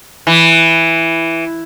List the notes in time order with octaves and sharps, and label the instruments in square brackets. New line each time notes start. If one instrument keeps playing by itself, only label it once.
[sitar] E3